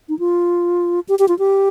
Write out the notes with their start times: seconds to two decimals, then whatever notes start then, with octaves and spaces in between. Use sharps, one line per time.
0.09 D#4
0.19 F4
1.09 G4
1.19 G4
1.28 F4
1.39 G4